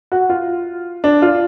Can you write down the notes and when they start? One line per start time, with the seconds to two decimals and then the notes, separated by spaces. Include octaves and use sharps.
0.12 F#4
0.29 F4
1.04 D4
1.22 F4